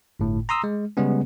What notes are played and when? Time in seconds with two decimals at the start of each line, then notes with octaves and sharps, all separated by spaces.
0.20 G1 A2
0.49 A#5 C6 D#6 E6
0.64 G#3
0.97 C#3 G3 G#3 B3 C#4